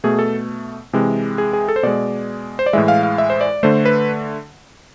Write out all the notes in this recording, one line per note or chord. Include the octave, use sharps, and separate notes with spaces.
B2 A3 G#4
A4
C3 E3 G#3
G#4
G#4
A4
C5
B2 G#3 D5
C5
D5
A2 E3 G#3 E5
F5
F5
E5
C5
D5
D3 A3 C5
B4